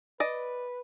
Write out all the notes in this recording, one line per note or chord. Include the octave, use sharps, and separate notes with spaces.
B4 D5 D#5